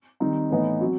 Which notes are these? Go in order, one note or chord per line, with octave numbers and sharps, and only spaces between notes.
D#3 G3 C4 D#4
A2 E3 B3 D#4
F#3 C4